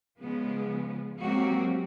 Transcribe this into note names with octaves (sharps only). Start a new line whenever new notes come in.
C#3 F3 G#3 B3
F#3 G#3 A#3 C4 F#4 G4